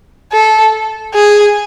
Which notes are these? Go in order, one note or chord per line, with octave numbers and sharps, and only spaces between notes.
A4
G#4